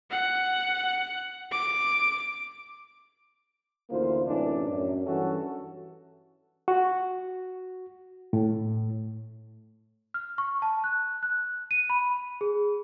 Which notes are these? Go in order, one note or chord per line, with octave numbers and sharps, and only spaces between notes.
F#5
D6
A1 D2 A#3 E4 F4 C5
F#2 A2 C3 E3 D4 D#4
F#2
G2 E3 C#4 F#4 A4
F#4
A2
F6
C#6
A5
F#6
F#6
D#7
B5
G#4